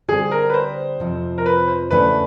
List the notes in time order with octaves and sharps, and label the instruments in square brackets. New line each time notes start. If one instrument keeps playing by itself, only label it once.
[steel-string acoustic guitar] D3 G3 C4 [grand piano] G#4
[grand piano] A#4
B4
C5
[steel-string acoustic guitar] F2 C3 F3
[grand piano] A#4
B4
C5
[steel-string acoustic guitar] E2 C#3 E3 A3 D4 [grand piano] B4